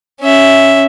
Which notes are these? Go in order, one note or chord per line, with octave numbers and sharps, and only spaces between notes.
C#4 E5